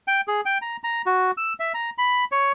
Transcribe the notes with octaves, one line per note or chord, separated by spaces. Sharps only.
G5
G#4
G5
A#5
A#5
F#4
E6
E5
A#5
B5
C#5